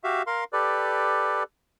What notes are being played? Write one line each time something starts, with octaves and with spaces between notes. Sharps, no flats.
F#4 G4 E5 F5
A#4 F5 C6
G4 A4 B4 D5